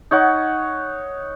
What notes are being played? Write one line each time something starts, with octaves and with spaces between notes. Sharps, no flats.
D#4 C#5 F#5